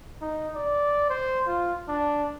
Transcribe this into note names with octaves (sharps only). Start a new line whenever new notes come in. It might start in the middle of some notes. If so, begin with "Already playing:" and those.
D#4
D5
C5
F4
D4